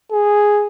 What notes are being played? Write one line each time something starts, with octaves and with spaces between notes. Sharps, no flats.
G#4